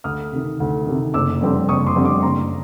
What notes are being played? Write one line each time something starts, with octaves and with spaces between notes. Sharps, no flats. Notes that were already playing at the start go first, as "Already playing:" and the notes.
D2 D#6 F6
C3 D#3
D2
C3 D#3
F#1 D6 E6
F2 D3 G3 C4
F#1 C#6 D#6
C6 D6
F2 D3 G3 C4
C6 D6
F#1 A#5 C6